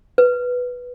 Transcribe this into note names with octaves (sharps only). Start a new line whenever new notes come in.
B4